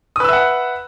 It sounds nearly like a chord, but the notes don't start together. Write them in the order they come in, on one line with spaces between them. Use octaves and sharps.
D#6 B4 E6 E5 F#5